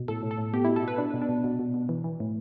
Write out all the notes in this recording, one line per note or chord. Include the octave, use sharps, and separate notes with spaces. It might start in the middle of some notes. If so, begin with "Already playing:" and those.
Already playing: B2
A2 A4
A2
A4
A2
B2 G4
B2 E4
A4
B2 B4
B2 D4
B2
D4
B2
B2
B2
B2
E3
E3
A2